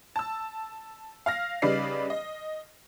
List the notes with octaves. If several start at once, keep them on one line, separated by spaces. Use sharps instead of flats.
A5 E6
F5 F6 A#6
C#3 G3 D#4 B4 D5 C7
D#5